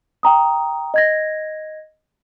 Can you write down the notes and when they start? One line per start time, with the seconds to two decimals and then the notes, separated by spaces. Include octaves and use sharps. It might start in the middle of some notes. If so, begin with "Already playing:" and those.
0.23 G5 A#5 D#6
0.94 D#5 G#6 A#6